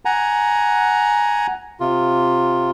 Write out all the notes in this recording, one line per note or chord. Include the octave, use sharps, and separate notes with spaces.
F#5 G#5 A#5
C3 F4